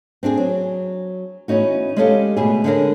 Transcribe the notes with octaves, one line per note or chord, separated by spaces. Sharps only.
C4 D4 F4 G#4
F#3
E3 B3 C#4 D#4 F#4
G#3 C#4 G4 A4 D#5 F5
D2 B2 G#4
D3 G#3 C#4 D4 G4 A#4